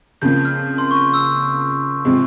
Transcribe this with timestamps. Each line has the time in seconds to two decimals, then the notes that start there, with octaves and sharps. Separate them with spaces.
0.21 F2 C#3 F3 A#3 G6
0.45 F6
0.78 C6
0.91 C#6
1.14 E6
2.05 C3 F3 G#3 C4